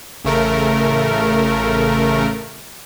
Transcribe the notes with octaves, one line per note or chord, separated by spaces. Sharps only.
A1 C#3 A3 A#4